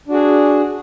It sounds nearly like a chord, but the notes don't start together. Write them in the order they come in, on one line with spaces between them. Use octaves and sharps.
D4 F#4 G#4